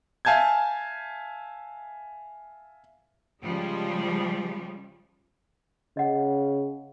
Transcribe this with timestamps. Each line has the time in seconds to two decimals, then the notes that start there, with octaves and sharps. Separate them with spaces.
0.25 E5 F5 G#5 A5 G6 G#6
3.41 C#3 F3 G3 G#3
5.97 C#3 D#5 F#5